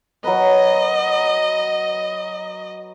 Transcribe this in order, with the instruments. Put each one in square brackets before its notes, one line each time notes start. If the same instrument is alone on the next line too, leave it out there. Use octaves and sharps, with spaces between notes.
[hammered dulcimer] F#3 A#4 B4 [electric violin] D#5